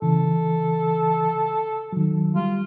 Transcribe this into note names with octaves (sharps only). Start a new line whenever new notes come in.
C#3 E3 A4
D#3 F#3
G3 F4